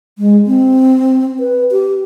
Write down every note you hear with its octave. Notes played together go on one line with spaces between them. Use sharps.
G#3
C4
B4
G4